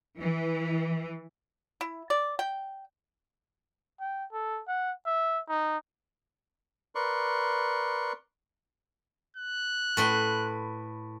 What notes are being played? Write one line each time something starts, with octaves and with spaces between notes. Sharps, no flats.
E3
E4
D5
G5
G5
A4
F#5
E5
D#4
A#4 B4 D5 C6 C#6
F#6
A2 B4 C6